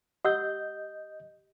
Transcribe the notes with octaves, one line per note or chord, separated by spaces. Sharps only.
G4 D#5 F#5 E6 G6